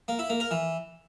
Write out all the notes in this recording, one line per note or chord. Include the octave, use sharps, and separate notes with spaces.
A#3
E4
A#3
A#4
E3